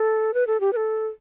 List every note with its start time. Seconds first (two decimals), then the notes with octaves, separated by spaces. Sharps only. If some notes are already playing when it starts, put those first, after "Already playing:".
Already playing: A4
0.34 B4
0.47 A4
0.60 G4
0.73 B4
0.76 A4